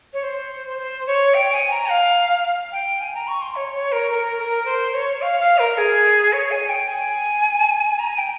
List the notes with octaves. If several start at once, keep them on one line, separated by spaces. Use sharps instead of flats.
C#5
C5
C5
C#5
G5
G#5
A#5
F5
G5
G#5
A#5
C#6
C6
C#5
C#5
A#4
A#4
A#4
C5
C#5
F5
F5
A#4
G#4
C#5
G#5
G5
G#5
A#5
G#5
G5